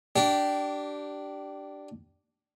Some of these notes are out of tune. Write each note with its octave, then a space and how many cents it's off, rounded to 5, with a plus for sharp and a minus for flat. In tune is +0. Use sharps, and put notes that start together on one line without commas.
D4 +0 G4 -20